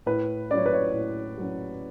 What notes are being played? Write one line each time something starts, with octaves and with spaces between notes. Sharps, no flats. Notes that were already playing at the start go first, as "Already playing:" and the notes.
A2 B4
F#3 C#4 C#5 D5
B4
C#5
A2
F#3 C#4